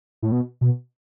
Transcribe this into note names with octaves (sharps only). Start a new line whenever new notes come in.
A2
B2
B2